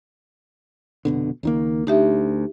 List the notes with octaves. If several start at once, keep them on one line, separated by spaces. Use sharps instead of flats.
F1 B2 D3
C#2 D#3 A#3
D2 D#4 G4 E5